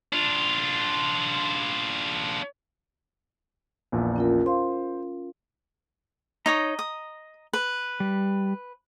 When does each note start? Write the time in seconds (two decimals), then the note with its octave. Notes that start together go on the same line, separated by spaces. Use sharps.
0.13 D4 F4
3.92 A#1 E2 A#2
4.16 C#4 F4 A#4
4.46 C5 F5 C6
6.46 D#4 C#5 D#5 A#5 D#6
6.79 D#6
7.53 B4
8.00 G3